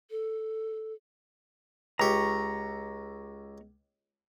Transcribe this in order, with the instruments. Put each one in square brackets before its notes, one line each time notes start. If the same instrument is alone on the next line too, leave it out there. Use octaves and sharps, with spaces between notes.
[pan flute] A4
[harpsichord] C#2 G4 [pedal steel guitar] A#5 C#6